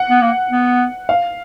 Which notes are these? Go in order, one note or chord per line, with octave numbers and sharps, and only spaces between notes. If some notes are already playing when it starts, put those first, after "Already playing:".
Already playing: F#5
B3
A#3
B3
F5